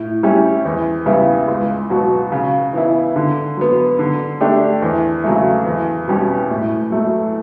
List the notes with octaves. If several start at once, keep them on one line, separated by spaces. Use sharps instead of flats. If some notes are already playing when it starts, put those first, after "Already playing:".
Already playing: A2
G3 C#4 E4 G4
E2
C#3 G3 B3 E4
C#2
B2 F#3 B3 F#4
C#3
E3 B3 E4
D3
F#3 B3
D3
A3 D4 G4
E2
C#3 F#3 A3
E2
B2 G3 C#4 G4
A2
F#3 A3